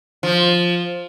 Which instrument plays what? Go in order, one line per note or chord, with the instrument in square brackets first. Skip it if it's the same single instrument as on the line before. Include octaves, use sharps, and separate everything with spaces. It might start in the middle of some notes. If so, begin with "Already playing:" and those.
[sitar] F3